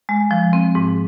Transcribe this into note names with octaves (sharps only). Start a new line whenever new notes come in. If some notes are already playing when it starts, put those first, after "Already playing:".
G#3
F3
C4
G#2